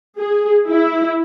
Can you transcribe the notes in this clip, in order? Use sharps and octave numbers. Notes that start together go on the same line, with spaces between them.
G#4
E4